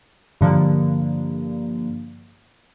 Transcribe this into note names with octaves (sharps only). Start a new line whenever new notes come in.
G2 D3 F3 A#3